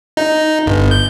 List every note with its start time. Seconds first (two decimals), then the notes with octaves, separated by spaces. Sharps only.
0.17 D#4
0.66 G1
0.91 G6